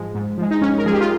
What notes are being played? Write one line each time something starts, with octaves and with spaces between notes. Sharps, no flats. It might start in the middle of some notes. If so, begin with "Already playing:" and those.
Already playing: G#2 F3 G#3
G#2
F3 G#3
D#4
G#2 C#4
A#4
F3 G#3 G#4
G4
F4